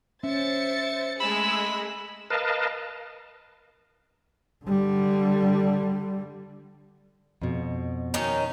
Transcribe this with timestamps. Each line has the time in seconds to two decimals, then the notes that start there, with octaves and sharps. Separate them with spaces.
0.23 C#4 C5 E5 A6 C#7
1.20 G#3 A3 G#4 B5 E6
2.30 A#4 B4 D#5 F5 A5
4.66 D3 G3
7.42 F2 B2
8.14 D#3 C#4 D#4